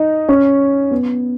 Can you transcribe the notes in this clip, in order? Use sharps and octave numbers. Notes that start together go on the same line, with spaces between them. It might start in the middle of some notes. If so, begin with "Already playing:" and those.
Already playing: D#4
C#4
B3